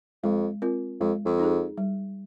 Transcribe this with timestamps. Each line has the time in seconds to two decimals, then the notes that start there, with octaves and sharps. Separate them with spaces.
0.23 F2 G#3
0.62 C4 F4 A#4
1.00 F2 G#3
1.25 F2
1.39 D#4 G#4
1.78 G3